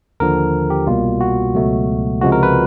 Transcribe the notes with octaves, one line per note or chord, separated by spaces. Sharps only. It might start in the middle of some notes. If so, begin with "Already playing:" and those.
D#2 D3 F3 A#4
G4
C2 B2 G3 A#3 F4
F#4
C#2 B2 F#3 A3
C#2 C3 F3 G#3 F#4
A#4
B4